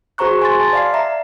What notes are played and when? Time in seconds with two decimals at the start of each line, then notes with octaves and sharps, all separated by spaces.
0.18 F#4 G#4 C5 A#5 C#6 F#6
0.42 G#5 C6 A6
0.61 A5
0.73 D5 F5 C7
0.93 E5 A#5